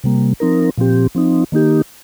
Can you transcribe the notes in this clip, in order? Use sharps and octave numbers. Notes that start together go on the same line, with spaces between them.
C3 G3 A#3
F3 C4 D#4 A#4
A#2 F3 C4 G4
F3 C4 D#4
D#3 A#3 D#4 G4